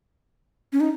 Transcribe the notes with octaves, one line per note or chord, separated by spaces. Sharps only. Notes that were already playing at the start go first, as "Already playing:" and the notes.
C#4
D#4